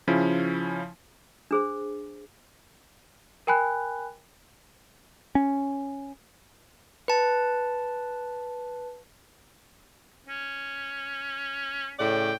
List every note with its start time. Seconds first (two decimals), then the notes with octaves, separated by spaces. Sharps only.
0.07 C#3 F3 C#4 E4
1.51 D4 G#4 C5
3.47 A#4 G5 G#5 B5 F#6
5.35 C#4
7.08 B4 A5
10.27 C#4
11.99 A2 C#3 D5 G5